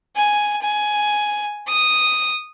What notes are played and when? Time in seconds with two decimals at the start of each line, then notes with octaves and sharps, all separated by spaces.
0.16 G#5
0.63 G#5
1.68 D#6